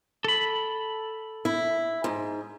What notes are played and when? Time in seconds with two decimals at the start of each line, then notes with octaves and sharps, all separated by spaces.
0.24 A4 B5
1.45 E4
2.04 G#2